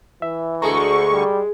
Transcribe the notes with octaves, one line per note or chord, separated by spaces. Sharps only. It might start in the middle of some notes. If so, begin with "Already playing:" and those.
E3 E5
D2 D3 G#3 G#4 A4 A#5 C#6
G3